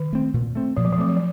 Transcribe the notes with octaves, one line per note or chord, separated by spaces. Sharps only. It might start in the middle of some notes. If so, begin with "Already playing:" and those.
Already playing: D#3
A3 C4
A#2
A3 C4
A#2 F3
F#3
F3
F#3 A3 C4
F3
F#3